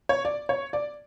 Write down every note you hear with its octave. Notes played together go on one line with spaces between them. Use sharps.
C#5
D5
C#5
D5